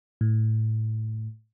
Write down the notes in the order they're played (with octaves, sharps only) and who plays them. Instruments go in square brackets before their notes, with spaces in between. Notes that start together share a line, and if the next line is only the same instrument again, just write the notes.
[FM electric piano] A2